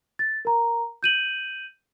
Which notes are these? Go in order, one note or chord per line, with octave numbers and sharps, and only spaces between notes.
A6
A#4 A#5
G6 D#7 F#7